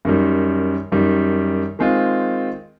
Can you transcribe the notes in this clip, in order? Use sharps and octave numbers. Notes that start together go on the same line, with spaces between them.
F#2 D#3 G3
F#2 D#3 G3
D#3 G#3 C4 F4